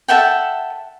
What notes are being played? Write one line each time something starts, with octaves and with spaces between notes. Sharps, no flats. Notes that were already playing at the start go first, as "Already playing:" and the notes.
A4 E5 F#5 G5